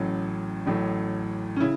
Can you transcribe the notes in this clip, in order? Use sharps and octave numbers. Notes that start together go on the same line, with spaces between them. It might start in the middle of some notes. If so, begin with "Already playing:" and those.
Already playing: A1 A2 F#3 C#4
A1 A2 F#3
C#4
C#3 E4